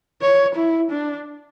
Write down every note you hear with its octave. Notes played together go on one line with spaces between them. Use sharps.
C#5
E4
D4